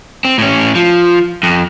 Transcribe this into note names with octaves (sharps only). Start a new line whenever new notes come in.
C4
A2 C#4
F3
F2